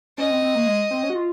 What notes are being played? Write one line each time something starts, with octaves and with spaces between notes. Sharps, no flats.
C#4 D#5
C4
C4
A#3
G#3
C4
C#4
F#4
F4